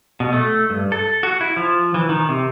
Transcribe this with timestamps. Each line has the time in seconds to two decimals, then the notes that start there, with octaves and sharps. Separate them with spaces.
0.20 B2
0.33 A3
0.70 G2
0.92 A4
1.23 F#4
1.41 E4
1.57 F3
1.94 E3
2.09 D#3
2.29 C3